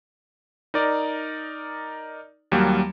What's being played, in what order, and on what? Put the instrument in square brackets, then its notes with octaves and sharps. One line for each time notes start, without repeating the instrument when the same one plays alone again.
[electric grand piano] D#4 A#4 D5
D#2 F#3 G3 A#3